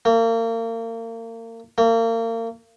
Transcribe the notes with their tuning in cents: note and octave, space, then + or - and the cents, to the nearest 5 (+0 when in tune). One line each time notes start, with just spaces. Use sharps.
A#3 -35
A#3 -35